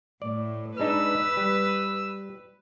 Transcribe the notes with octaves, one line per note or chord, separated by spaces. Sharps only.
A2 D5
G#3 D4 D#4 B4 E6
G3